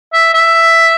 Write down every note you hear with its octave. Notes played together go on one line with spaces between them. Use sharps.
E5
E5